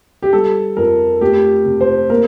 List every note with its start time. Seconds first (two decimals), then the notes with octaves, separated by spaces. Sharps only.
0.23 G4
0.33 G3 A4
0.77 F2 A#4
1.21 A3 G4
1.65 C3
1.81 C5
2.09 A#3 A#4